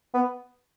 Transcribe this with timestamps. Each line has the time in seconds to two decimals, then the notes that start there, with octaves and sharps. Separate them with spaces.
0.14 B3